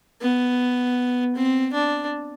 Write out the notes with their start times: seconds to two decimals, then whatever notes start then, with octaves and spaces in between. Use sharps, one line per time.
0.21 B3
1.35 C4
1.73 D4